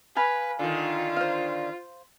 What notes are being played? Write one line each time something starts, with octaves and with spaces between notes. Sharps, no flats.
B4 F5 G#5 B5
D3 D#3 F4
C5 F5